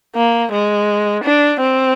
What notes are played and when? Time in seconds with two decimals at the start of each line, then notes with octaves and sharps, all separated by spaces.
0.15 A#3
0.52 G#3
1.24 D4
1.61 C4